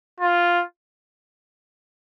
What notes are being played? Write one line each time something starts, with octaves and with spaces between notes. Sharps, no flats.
F4